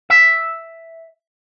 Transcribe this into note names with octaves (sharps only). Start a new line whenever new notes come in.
E5